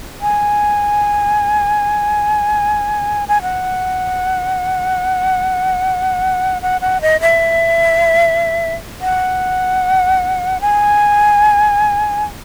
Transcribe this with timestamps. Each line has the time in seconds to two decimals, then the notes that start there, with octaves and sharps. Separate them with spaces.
0.21 G#5
3.28 G#5
3.42 F#5
6.62 F#5
6.81 F#5
7.01 D#5
7.21 E5
9.01 F#5
10.61 G#5